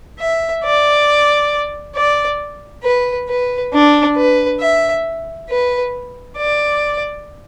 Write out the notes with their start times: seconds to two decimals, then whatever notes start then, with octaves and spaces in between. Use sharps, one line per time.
0.20 E5
0.64 D5
1.96 D5
2.84 B4
3.29 B4
3.73 D4
4.17 B4
4.60 E5
5.49 B4
6.38 D5